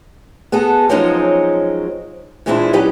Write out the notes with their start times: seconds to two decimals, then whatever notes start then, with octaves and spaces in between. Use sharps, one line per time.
0.52 B3 F#4 G#4 A4
0.89 F3 F#3 G#3 C4 C#4 D#4
2.46 A#2 E3 G#3 C4 D4 E4
2.73 F#3 C#4 D#4 G4 B4